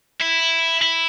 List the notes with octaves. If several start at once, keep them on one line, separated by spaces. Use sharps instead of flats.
E4
E4